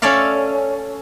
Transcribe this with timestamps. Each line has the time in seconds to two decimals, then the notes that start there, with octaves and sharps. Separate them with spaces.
0.02 C#4 A4 C#5 D5 E5 F5